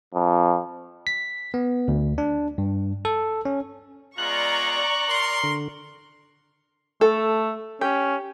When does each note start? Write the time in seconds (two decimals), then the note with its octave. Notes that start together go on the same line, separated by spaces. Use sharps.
0.14 F2
1.07 B6
1.54 B3
1.88 D2
2.18 D4
2.58 G2
3.05 A4
3.45 C#4
4.18 G#3 B3 F4 D5 A#5 C#6 F#6
5.08 A#4 C6
5.44 D3
7.01 A3 A4
7.81 C#4 G4